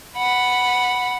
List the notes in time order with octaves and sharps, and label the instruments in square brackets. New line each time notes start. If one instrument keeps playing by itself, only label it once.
[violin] F#5 B5